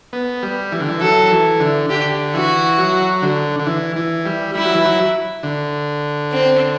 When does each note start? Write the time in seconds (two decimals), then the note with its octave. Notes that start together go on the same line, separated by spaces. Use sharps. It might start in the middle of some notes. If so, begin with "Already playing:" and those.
0.13 B3
0.43 G3
0.72 E3
0.80 D3
0.89 E3
1.01 F#3 A4
1.31 E3
1.60 D3
1.90 D3 G4
2.34 E3 F#4
2.78 F#3
3.22 D3
3.60 D3
3.67 E3
3.96 E3
4.26 G3
4.55 G3 E4
4.65 F#3
4.75 E3
4.85 F#3
5.43 D3
6.32 C4